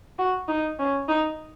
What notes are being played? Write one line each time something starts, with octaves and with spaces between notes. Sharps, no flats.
F#4
D#4
C#4
D#4